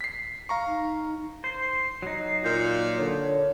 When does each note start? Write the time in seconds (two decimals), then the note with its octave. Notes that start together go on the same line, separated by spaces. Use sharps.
0.01 B6 C7
0.49 F5 A#5 C#6
0.67 D#4
1.44 C5 C7
2.02 F#3 D#4
2.44 A#2 F4 G6
2.98 D3 C#5